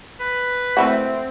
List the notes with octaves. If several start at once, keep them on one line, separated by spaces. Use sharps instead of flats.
B4
A3 C4 E4 F#4